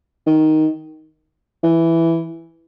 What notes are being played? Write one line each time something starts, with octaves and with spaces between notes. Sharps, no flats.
D#3
E3